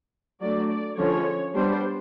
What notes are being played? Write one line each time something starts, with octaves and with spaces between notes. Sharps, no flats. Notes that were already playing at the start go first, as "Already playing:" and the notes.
F#3 A3 D4 D5
D5
D3 F3 G#3 C#4 C#5
G3 B3 D4 C5